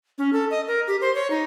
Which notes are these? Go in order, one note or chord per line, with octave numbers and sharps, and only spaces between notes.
C#4
A4
D#5
A#4
G4
C5
C#5
D#4